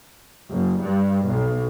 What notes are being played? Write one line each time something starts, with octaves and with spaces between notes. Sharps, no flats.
F#1
G2
B1